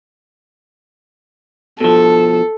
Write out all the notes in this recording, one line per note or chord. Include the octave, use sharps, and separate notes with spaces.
B2 F3 A4